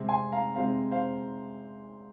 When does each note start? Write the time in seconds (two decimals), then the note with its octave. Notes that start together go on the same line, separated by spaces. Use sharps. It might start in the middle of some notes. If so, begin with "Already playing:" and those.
Already playing: C3 G#3 C4
0.09 G#5 C6
0.32 F5 A#5
0.56 C3 G#3 C4 C5 F5
0.91 C5 F5